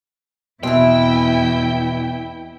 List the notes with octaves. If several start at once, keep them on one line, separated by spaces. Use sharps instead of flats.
E2 B2 E3 C4 E4 G5